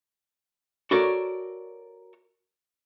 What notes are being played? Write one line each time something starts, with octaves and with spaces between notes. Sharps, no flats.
F#4 A4 A#4 C#5 D5